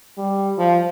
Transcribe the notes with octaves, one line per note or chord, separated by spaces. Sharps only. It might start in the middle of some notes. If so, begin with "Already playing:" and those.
G3
F3